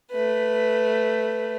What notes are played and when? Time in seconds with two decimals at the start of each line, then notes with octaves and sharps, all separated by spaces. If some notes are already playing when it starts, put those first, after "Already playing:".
0.12 A3 B4